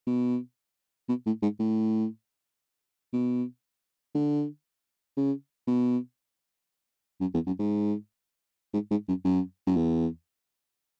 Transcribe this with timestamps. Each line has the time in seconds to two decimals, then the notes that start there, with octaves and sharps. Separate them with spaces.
0.07 B2
1.08 B2
1.26 A2
1.42 G#2
1.59 A2
3.13 B2
4.14 D3
5.17 C#3
5.67 B2
7.20 F#2
7.34 E2
7.46 F#2
7.59 G#2
8.73 G#2
8.90 G#2
9.08 F#2
9.25 F#2
9.67 F#2
9.76 E2